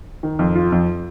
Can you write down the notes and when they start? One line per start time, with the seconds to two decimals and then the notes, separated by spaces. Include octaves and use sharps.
0.23 D#3
0.39 F2
0.55 F4
0.72 F2